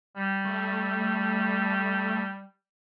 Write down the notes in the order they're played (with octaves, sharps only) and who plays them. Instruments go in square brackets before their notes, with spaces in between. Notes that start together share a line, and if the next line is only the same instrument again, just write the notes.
[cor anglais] G3
[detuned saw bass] A3